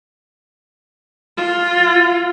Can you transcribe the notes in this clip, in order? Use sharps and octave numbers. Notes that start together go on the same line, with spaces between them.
F4